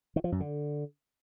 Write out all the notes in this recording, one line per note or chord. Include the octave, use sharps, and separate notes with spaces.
D#3
F3
F#2
D3